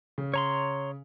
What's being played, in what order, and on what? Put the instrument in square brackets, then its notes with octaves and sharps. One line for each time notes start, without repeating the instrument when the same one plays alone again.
[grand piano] C#3
[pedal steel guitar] C#5 A#5 C6